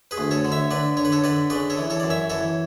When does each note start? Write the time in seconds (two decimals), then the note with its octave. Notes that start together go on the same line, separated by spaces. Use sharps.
0.11 G#4 B4
0.18 D2
0.31 A4 C#5
0.45 D3
0.52 C#5 E5
0.71 D3 B4 D5
0.97 D3 C#5
1.05 B4
1.12 A4 C#5
1.24 D3 B4 D5
1.50 C#3 B4 D5
1.70 A4 C#5
1.78 E3
1.90 A4 C#5
2.00 F#2 D5
2.10 C#5 E5
2.30 E3 A4 C#5